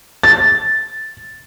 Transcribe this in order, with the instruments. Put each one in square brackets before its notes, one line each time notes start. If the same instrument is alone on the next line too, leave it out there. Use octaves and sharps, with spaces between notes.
[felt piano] A6